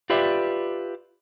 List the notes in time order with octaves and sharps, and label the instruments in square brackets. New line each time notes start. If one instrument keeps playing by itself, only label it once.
[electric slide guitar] F4 G4 B4 D5 E5